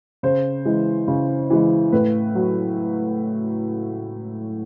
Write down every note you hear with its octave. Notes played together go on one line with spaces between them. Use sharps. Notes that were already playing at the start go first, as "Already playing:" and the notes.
C#3 C5
E3 G#3
C#3
E3 G#3
A2 B4
F#3